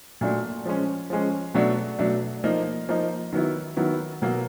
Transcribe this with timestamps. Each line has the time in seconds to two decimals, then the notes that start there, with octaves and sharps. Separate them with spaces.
0.21 A#2 F#3 A3 D4
0.66 F3 G#3 C#4
1.10 F3 G#3 C#4
1.54 B2 F#3 A3 D4
1.99 B2 F#3 A3 D4
2.44 F3 A#3 D#4
2.89 F3 A#3 D#4
3.33 D#3 F#3 B3 E4
3.77 D#3 F#3 B3 E4
4.22 B2 F#3 A#3